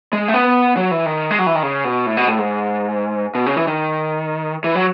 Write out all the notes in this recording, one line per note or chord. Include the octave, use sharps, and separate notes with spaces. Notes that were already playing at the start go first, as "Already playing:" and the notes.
G#3
A3
B3
F#3
E3
D#3
G#3
F#3
E3
D#3
C#3
B2
A2
B2
A2
G#2
B2
C#3
E3
D#3
E3
F#3